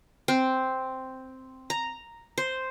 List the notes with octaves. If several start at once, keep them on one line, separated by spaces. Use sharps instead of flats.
C4
A#5
C5